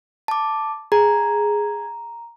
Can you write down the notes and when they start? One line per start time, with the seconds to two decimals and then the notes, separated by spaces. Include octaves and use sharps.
0.28 A5 D6
0.92 G#4 A#5